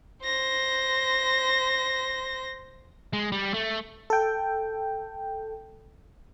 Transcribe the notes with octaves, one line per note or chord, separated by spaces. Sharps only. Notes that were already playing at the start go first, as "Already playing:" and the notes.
C5 A#6
G#3
G3
A3
A4 G5